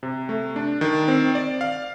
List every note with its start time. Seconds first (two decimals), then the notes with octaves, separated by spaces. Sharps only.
0.03 C3
0.29 A3
0.56 D4
0.81 D#3
1.08 C4
1.35 D5
1.61 F5